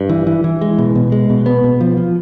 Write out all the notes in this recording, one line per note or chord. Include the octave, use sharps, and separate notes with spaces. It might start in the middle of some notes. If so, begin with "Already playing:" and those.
Already playing: G2
E3
E3
E3
G#3
B2
B2
G#3
B2
B3
B2
F3
F3